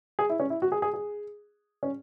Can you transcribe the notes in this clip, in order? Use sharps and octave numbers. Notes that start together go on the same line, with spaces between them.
G#4
E4
C#4
E4
F#4
G#4
G#4
G#4
C#4